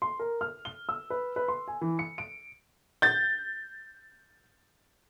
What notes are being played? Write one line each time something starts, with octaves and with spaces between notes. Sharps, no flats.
C6
A#4
F6
G7
E6
B4
B4
C6
G#5
E3
C#7
D7
G6 A6